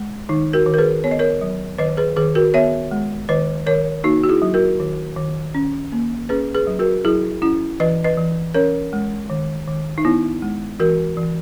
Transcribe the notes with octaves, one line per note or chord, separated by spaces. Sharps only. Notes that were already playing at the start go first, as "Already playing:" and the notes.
Already playing: G#3
D#3 D#4
F#4 A#4
D#3
A#4
G#4 B4
B3 C#5
D#5
A#4 C#5
F#3
D#3 B4 D#5
G#4 B4
D#3 G#4 B4
F#4 A#4
B3 C#5 E5
G#3
D#3 B4 D#5
D#3 A#4 C#5
A#3 D#4 F#4
F#4
E4 G#4
F#3
F#4 A#4
D#3
D#3
C#4
A#3
C#4 G#4 B4
G#4 B4
F#3
F#4 A#4
F#3 E4 G#4
C#4 E4
E3 B4 D#5
B4 D#5
E3
C#4 A#4 C#5
G#3
D#3
D#3
D#4
B3 E4
G#3
E3 F#4 A#4
E3